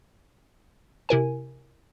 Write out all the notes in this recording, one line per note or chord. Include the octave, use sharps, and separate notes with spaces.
C3 E4 A#4 G#5